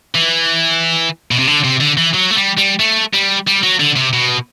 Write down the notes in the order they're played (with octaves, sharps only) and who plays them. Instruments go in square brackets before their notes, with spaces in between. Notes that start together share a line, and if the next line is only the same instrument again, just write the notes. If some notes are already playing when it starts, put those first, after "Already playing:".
[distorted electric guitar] E3
B2
C3
D3
C3
D3
E3
F#3
A3
G3
G3
A3
G3
G3
F#3
D3
C3
B2